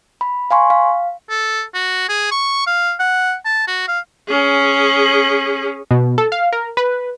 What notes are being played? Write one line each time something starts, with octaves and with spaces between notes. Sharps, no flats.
B5
F5 G#5 C6 C#6
F5
A4
F#4
G#4
C#6
F5
F#5
A5
F#4
F5
C#4 G#4
B2
A4
F5
A#4
B4